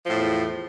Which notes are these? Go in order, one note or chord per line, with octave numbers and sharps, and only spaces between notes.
E2 A2 F3